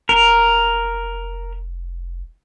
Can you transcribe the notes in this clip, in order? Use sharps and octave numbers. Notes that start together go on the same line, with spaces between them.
F1 A#4